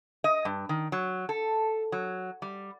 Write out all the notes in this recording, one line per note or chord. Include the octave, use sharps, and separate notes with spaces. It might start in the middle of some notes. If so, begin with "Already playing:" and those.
D#5
G2
D#3
F#3
A4
F#3
G3